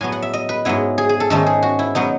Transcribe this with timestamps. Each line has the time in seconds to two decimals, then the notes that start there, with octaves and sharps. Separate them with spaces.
0.01 A2 F#3 B3 G#5
0.12 F#5
0.22 E5
0.33 D#5
0.49 B4
0.65 G#2 F#3 B3 E4
0.98 G#4
1.09 G#4
1.20 A4
1.30 G#2 D#3 A3 C#4 A4
1.46 G#4
1.62 F#4
1.79 E4
1.95 B2 F#3 B3 D#4